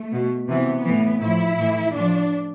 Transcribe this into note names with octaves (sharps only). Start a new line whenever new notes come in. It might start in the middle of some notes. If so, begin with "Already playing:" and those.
Already playing: A3
B2
C3 E3 B3
A2 E3
A2 F3 E4
A2 E3
A2 F3 D4